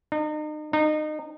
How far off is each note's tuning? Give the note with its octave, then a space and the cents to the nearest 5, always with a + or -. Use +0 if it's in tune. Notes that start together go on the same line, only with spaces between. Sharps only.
D#4 -35
D#4 -25